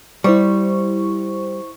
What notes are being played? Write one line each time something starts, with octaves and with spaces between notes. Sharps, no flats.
G3 E4 C5 C#6